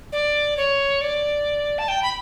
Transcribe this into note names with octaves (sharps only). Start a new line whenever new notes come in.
D5
C#5
D5
A5
G5
B5